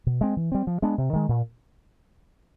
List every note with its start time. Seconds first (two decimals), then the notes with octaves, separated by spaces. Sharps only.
0.07 B2
0.21 G#3 C4
0.37 E3
0.52 G3 C4
0.67 F3
0.82 G#3 B3 D4
0.98 C3
1.13 D#3 G#3
1.29 A#2